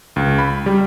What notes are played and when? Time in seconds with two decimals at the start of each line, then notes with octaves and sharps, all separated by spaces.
0.16 C#2
0.39 B5
0.66 G3